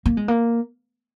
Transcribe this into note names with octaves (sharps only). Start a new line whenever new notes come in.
A#3
G#3
A#3